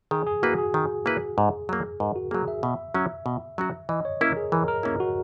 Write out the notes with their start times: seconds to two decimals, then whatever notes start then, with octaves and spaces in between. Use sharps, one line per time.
0.11 D#3 G#4
0.27 G#4
0.43 A#3 E4 F#4 B4
0.58 G#4
0.74 D#3
1.06 A#3 E4 B4
1.38 G#2
1.69 F#3 A#3
2.00 G#2 A#4
2.16 F#4
2.31 F#3 A#3 G#4
2.48 E5
2.63 B2 E5
2.94 F#3 C#4 F#4 E5
3.26 B2
3.58 F#3 C#4 F#4
3.89 E3 D#5
4.05 C#5
4.21 A#3 C#4 E4 A#4
4.37 G#4
4.52 E3 A#4
4.68 A#4
4.83 A#3 C#4 E4
5.00 F#4